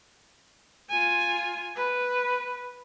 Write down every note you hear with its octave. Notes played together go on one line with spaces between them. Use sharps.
F4 G#5
B4